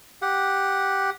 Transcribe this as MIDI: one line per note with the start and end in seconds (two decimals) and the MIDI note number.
0.22 1.10 67
0.22 1.10 78